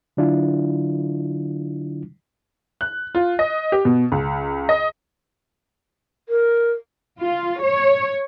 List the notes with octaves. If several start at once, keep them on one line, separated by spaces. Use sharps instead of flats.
D3 F#3 D4 E4 F4
F#6
F4
D#5
G4
B2
C#2
D#5
A#4
F4
C#5